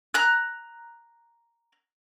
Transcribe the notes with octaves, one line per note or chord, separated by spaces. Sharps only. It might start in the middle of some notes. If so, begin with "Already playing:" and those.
A#5 F6 F#6